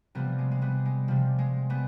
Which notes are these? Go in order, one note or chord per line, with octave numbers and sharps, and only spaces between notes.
C3 F3 G3 B3
G#3
G#3
G3 B3
G#3
C3 F3 G3
G#3
G3 B3